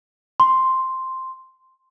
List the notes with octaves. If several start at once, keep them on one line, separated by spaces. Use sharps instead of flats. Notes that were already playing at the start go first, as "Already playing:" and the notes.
C6